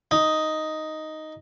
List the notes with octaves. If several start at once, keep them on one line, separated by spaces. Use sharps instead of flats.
D#4